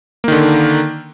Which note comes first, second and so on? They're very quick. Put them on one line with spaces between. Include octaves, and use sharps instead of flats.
A#3 D#3 D3